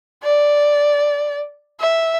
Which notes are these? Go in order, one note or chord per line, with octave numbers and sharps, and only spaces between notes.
D5
E5